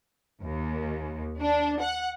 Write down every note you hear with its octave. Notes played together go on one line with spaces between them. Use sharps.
D#2
D4
F#5